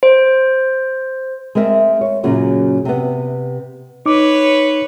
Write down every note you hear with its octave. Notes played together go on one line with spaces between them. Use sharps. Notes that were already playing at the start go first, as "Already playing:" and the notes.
C5
G#3 C4 A#4 E5
C#5
F#2 A#2 C#3 A#3 F4 F#4
C3 B3
D#4 B4 C#5 D6